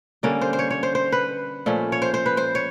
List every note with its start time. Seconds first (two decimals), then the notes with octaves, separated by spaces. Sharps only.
0.23 D3 G3 A#3 C#4
0.41 C5
0.53 C5
0.59 C#5
0.71 C#5
0.83 C5
0.95 C5
1.12 B4
1.66 A#2 F3 A3 C#4
1.92 C#5
2.02 C5
2.14 C5
2.26 B4
2.37 C5
2.55 C#5